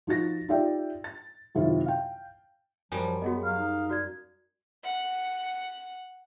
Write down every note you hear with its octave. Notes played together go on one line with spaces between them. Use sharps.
F3 D#4 F#4 A6 A#6
D#4 F4 G4 D5 E5 G5
A6
F#2 C3 D#3 E4 F4
F5 G5
F#2 F3 G3 G#5
B3 F#4 G#4 D#5
F#3 F5
D#4
F#4 D5 G#6
F#5